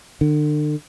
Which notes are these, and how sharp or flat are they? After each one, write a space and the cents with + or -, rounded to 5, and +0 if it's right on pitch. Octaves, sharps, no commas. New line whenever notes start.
D3 +40